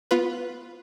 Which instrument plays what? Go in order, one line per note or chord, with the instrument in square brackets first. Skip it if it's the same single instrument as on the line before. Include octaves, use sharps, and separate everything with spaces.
[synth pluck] B3 F4 B4